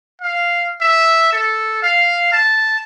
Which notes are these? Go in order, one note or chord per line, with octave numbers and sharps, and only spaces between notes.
F5
E5
A4
F5
A5